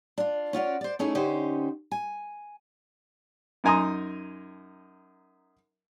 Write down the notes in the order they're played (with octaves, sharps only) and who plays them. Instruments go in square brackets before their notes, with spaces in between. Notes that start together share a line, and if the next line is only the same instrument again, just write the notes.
[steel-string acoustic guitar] D4 F4
C#4 F4 F#4 D5
C5 D5
A3 C#4 D#4 E4 G#4
D3 C#4 D#4 G4 C5
G#5
[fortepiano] F#2 D#4 G#5 A#5 C6 D#6